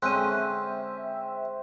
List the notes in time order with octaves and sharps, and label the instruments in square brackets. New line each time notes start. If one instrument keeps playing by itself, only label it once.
[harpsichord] D3 G#3 C#4 [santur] C4 [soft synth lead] E5 [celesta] F#6 D#7